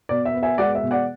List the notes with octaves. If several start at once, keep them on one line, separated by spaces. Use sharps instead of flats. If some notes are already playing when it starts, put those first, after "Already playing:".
B2 D5
E5
B3
E5 G#5
G#3 D5 F#5
E5
B2
D5 F#5